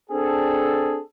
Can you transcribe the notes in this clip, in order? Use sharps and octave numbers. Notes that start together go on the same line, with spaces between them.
C4 D4 G#4 A4